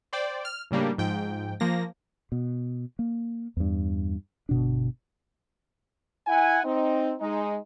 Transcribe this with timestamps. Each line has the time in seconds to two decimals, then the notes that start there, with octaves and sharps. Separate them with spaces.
0.13 C5 D5 G5
0.45 F6
0.71 A2 C#3 G3 A#3 D4
0.98 G#2 F3 G5
1.60 F3 A#3 A#6
2.32 B2
2.99 A#3
3.57 E2 G2
4.49 G1 B2 D4
6.27 E4 F#5 G#5
6.64 C4 D#4
7.20 G#3 D#4